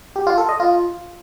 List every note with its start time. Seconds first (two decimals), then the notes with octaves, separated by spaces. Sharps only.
0.16 G4
0.27 F4
0.38 A4
0.49 D#5
0.60 F4